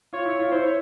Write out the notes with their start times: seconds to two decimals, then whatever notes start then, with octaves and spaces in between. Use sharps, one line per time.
0.13 F4 C#5
0.26 E4
0.39 F4
0.52 E4 C5
0.63 C#5